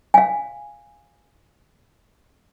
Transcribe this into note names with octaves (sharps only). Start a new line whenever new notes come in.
F5 G#5